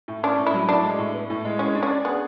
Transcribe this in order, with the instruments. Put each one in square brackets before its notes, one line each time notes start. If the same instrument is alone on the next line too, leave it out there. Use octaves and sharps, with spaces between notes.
[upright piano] A2
[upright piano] C#4 [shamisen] D4
[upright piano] A2
[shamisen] E4
[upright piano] F#3
[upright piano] A2 [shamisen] D4
[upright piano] G#3
A2
B3
A2
G#3
[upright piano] G#3 [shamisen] C#4
[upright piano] D4
[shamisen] C#4
[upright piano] D5
[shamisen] B3 [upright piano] G#4